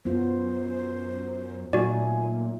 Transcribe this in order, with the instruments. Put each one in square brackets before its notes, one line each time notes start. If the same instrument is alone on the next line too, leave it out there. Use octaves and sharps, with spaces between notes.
[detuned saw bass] F#2 [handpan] B3 F4 [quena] C5
[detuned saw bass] A#2 [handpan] F#3 A3 D#4 [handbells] F#4 D5 [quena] G#5